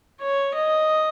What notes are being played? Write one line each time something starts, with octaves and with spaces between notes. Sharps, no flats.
C#5
D#5